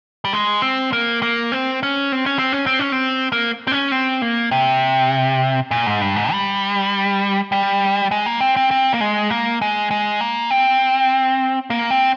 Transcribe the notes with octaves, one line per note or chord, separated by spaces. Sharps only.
G3
G#3
C4
A#3
A#3
C4
C#4
C4
C#4
C4
C#4
C4
C#4
C4
A#3
C4
C#4
C4
A#3
C3
A#2
G#2
G2
G#2
G3
G3
G#3
A#3
C4
C4
C4
A#3
G#3
A#3
G#3
G#3
A#3
C4
A#3
C4